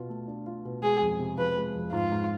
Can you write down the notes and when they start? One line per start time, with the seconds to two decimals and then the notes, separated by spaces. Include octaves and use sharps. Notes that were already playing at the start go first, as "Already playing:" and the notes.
Already playing: B2 F4
0.09 A3
0.28 D4
0.46 F4
0.65 B2
0.82 G#3 G#4
1.02 F2
1.19 C3
1.37 F3 B4
1.57 G#3
1.75 F2
1.92 G#2 F4
2.12 G#2